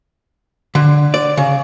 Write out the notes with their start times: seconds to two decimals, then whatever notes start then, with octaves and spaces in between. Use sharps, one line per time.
0.75 D3
1.14 D5
1.37 C#3